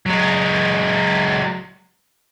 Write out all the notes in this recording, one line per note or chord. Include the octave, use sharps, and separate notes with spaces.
F#3 G#3